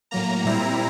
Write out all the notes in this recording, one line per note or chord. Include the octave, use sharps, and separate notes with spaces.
A2 F#3 A#3 A#5
A#2 G3 C4 E4 A#5